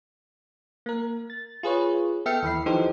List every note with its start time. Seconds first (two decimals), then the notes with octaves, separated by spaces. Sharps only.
0.86 A#3 A#4
1.30 A6
1.63 F4 G#4 B4 C#5
2.26 B3 A4 E5 G5 F6 C#7
2.42 D#2 E3 B5 C7
2.66 E3 F3 D#4 G4 A4 C5